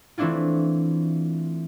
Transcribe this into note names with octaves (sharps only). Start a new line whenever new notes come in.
E3 A3 C4 D4 E4 F4